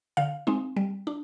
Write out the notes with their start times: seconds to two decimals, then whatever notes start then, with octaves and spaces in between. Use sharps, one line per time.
0.17 D3 F5
0.47 G#3 C4 D#4
0.76 G3
1.07 D4